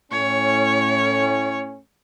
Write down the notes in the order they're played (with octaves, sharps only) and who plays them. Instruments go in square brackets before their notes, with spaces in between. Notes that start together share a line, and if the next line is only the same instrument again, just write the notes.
[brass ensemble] A2 C#4 [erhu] C#5